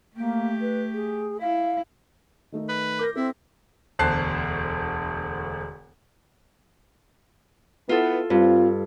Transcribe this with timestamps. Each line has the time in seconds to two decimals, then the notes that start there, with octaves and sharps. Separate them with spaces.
0.16 A3 A#3 G4
0.61 B4
0.94 G#4
1.41 E4 F5
2.52 D#3 A3 D#4
2.69 B4
2.99 A#4 D6 G6 A#6
3.16 C4 E4 A4
3.99 E1 D2 C5 A5 F#6 C7
7.89 B3 E4 F4 A4
8.30 G2 C4 F4